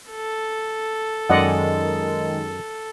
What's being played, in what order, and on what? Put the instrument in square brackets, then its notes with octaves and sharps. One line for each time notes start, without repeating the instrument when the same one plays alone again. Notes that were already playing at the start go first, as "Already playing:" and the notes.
[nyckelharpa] A4
[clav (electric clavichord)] F#2 [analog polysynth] D#3 G#3 [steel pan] D5 D#5 F#5